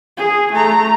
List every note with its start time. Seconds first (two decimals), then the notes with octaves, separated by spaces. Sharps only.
0.17 G#4
0.52 A3 A#5